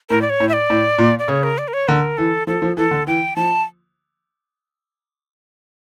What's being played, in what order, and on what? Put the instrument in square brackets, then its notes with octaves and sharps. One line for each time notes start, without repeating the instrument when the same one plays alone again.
[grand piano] A2 [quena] A#4
[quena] D5
C#5
[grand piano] A2
[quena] E5
D5
[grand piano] A2
A#2
[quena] D5
[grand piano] C#3 [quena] C#5
[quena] A#4
D5
A#4
C#5
[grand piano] D3 [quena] A#4
[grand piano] E3 [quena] A4
[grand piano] F3 [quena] A4
[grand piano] F3
[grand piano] E3 [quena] A4
[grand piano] D3
[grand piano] E3 [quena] G5
[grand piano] F3 [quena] A5